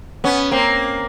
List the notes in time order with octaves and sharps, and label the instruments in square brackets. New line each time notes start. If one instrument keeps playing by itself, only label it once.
[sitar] B3 C#4
A#3 C4